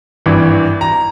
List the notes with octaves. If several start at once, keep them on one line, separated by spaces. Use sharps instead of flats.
G#1 G2 E3
A#5